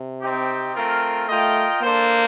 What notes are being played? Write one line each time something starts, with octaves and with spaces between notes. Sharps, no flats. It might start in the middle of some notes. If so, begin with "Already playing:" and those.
Already playing: C3
C4 D#4 G4
A3 C4 F4 A#4
A3 F4 A#4 D#5 G5
A#3 D4 A4 C5